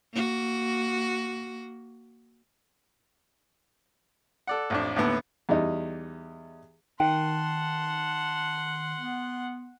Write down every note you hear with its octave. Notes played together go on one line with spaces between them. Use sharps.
A#3 F#4
A4 D5 F#5
A1 F2 D4
D#2 A2 D3 B3
E2 G3 D#4
D#3 F#5 G5 A5 C6
B3